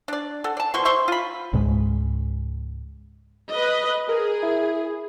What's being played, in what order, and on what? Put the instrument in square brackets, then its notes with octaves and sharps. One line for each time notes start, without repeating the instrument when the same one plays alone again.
[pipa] D4 D5
A4 F#5
D5 A5
B2 F3 C6 C#6
C5 E5 C6 C#6
F4 B5
[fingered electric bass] C#2 G#2 G#3
[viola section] B4 D#5
[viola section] G#4 [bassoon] A#4
[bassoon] E4